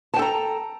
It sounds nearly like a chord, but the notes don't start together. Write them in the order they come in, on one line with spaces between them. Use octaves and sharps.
A5 G5 A4 A#5